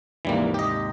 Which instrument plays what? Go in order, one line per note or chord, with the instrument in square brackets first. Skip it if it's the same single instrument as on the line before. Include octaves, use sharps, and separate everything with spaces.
[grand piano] D#2 G#2 C3 [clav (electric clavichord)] E3 G3 A#3
[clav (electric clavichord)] G4 D#5